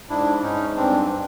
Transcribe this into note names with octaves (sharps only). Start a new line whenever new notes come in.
G#2 D4 E4
G#2 C#4 D#4
G2 C4 D4